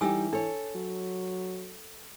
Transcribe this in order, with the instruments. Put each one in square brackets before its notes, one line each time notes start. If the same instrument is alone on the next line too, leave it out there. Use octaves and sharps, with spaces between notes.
[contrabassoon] E3 [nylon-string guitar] G3 D#4 G4 [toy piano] A4 G#5 E6
[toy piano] D4 [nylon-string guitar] A4 C#5
[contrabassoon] F#3